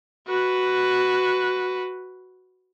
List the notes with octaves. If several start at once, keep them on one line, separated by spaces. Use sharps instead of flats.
F#4 B4